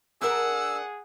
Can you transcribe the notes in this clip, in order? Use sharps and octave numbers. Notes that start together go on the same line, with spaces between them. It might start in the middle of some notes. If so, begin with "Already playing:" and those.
D4 G#4 A#4 F#5 E6